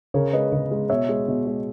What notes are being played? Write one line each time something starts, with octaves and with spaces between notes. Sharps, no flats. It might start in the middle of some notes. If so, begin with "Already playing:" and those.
C#3 A#4 C#5
G#3 B4 D#5
C#3
G#3
B2 C#5 E5
G#3
B2
G#3